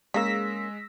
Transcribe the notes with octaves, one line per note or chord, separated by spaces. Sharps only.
C#3 G#3 A#3 E6 A#6 B6